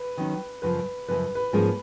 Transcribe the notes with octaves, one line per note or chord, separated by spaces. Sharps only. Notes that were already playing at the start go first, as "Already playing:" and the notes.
Already playing: B4
D#3 F#3 C#4
F#2 C#3 F3 B4
F#2 C#3 F3 B4
B4
G#2 F3 A#3 C#4 G#4